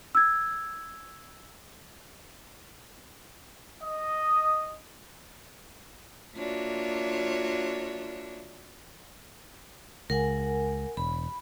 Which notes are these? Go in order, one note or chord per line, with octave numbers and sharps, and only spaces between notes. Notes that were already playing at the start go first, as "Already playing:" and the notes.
E6 G#6
D#5
A#3 D4 F4 F#4 C#5 E5
C#2 A#4 F#5 G#5
E1 B5